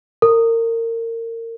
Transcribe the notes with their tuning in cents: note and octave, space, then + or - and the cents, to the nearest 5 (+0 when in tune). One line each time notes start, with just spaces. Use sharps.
A#4 -30